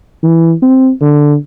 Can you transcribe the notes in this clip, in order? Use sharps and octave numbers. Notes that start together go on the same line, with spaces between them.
E3
C4
D3